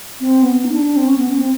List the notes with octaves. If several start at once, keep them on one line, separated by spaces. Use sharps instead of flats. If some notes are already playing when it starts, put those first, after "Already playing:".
C4
B3
D#4
D4
D4
C4
C#4
B3
C#4
C4